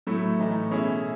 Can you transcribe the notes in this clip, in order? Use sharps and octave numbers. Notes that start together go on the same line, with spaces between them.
A2 F#3 A3 E4
A2 E3 A3 D#4
B2 A3 C#4 E4 G#4